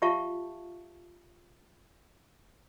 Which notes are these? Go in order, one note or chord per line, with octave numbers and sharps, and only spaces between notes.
F4 G4 E5 F5 A5 C#6